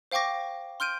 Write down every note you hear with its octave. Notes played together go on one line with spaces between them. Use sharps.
C5 F5 G5 C#6 D6 A#6
C6 F6 G6 D7 D#7